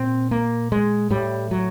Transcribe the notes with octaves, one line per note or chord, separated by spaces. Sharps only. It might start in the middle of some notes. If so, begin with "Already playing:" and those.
Already playing: A#2 C4
A#3
G#3
A2 G3
F#3